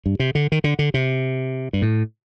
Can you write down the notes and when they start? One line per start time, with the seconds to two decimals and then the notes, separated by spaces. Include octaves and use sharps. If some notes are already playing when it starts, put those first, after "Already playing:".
0.06 G2
0.19 C3
0.35 D3
0.52 D#3
0.64 D3
0.79 D3
0.94 C3
1.73 G2
1.82 A2